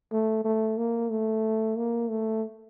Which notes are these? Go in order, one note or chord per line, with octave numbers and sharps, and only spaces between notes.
A3
A3
A#3
A3
A#3
A3